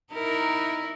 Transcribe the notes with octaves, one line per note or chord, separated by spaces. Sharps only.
D#4 E4 A#4